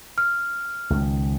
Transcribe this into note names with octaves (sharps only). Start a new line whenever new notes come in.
F6
C#2 D#3